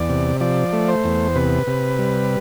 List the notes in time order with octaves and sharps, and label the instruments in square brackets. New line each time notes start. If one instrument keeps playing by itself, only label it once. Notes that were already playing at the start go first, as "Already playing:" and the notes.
Already playing: [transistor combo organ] E2 D5
C3
F3 D5
A3
C5
E2
C3 B4
C3
G3